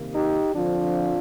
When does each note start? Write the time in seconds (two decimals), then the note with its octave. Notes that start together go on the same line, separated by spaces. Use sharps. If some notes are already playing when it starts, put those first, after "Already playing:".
Already playing: C3 D#3 A#3
0.14 D#4 G4
0.53 D3 F3 C4 D4 F4